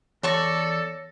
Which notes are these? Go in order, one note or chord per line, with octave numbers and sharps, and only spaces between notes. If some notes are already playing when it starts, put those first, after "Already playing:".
E2 A4 C#5 D5 A5 C#6 A#6